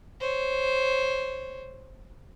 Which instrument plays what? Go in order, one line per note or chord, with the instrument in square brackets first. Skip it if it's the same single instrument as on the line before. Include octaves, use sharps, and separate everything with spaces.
[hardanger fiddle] C5 C#5